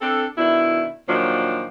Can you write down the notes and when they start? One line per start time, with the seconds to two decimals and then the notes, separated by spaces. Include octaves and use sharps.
0.01 C4 D4 A4
0.38 B2 D#3 D4 E4
1.07 A#2 D#3 F3 F#3 D4